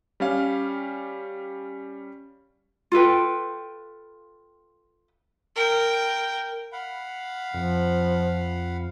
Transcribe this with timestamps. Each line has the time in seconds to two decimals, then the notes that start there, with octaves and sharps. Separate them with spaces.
0.20 G3 C#4 F5
2.92 F4 A4 B4 G5
5.55 A#4 G5
6.72 F5 F#5 B5
7.54 F2 F3